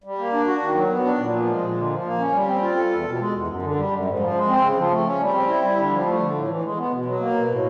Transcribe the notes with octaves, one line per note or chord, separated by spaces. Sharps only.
G3
A#3
D4
F#4
D#3
F#3
B3
D4
A#2
F3
G#3
A#2
D3
F3
A#3
C#4
G3
C4
F4
A4
E2
B2
G#3
E2
F#2
D3
G3
F#2
G#2
F3
G#3
C4
C#3
F3
A3
C#4
G3
C4
E4
G3
D3
F3
A3
D3
A2
E3
G#3
B3
B2
F#3
A#3
B2
A2